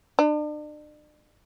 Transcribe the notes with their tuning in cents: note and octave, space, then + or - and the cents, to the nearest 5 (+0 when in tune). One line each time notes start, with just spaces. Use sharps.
D4 +40